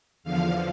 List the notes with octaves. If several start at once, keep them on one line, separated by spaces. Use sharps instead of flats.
E2 D3 F3 F5